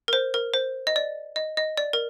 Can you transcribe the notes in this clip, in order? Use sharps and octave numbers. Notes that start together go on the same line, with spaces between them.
A#4
C5
A#4
C5
D#5
D5
D#5
D#5
D5
A#4